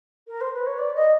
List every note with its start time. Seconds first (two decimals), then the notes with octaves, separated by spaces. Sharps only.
0.27 A#4
0.41 C5
0.54 B4
0.66 C#5
0.78 D5
0.95 D#5